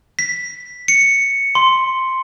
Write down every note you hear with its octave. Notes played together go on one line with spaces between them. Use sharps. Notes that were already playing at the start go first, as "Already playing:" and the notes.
B6
C#7
C6